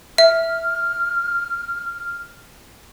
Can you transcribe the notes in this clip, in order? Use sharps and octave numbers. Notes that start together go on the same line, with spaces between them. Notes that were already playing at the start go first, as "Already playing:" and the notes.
E5 F6